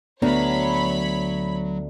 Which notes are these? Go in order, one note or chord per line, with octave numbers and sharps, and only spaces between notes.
D2 F#3 B3 D4 C#5 A#5 B5